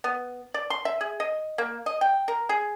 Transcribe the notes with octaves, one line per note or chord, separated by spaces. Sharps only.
B3
D5
C6
E5
G#4
D#5
A#3
D#5
G5
A#4
G#4